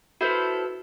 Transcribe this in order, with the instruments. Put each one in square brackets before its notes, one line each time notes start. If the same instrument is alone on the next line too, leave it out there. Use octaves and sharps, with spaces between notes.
[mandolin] E4 A4 C5 [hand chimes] F#4 B4